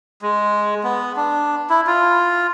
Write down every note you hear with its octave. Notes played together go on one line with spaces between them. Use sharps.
G#3
B3
D4
E4
F4